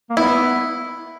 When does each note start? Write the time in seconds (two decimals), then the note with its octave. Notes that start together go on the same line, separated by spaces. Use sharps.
0.10 A#3
0.17 B3 E4